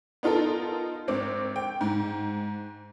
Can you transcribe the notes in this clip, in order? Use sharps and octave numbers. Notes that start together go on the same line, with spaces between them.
B3 D#4 F4 A4 A#4
G#1 C4 D6
G5
G#2